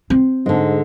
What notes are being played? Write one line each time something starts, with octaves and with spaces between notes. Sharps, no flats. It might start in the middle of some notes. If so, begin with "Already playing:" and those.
C4
G#2 D3 G#3